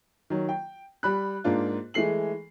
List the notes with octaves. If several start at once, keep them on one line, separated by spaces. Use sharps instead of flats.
D#3 F#3
G5
G3 B5 F#6
G#2 A#3 D4 F4
E3 G#3 A3 C7 F#7